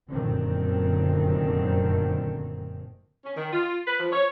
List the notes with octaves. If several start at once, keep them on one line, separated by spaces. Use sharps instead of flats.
F1 F#2 A#2 D3 D#3 C4
C#4
D#3
F4
B4
F3
C#5